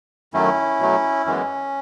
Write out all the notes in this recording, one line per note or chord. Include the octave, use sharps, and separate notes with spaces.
F#2 D#3 F#3 A3 C#4 E4
B2 F#3 A3
F#2 E3 G#3 B3 C#4